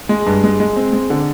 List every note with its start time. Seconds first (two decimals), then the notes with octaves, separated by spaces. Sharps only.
0.09 G#3
0.26 G2
0.44 G#3
0.60 G#3
0.76 C4
0.93 G#3
1.10 D3